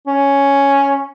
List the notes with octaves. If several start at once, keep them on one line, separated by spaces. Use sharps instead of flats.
C#4